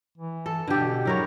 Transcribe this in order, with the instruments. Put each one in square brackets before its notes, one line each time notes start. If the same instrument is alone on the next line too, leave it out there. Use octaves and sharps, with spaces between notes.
[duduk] E3
[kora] A4
[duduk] B2 [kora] D3 G4
[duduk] F#3 [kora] E4 A#4 C#5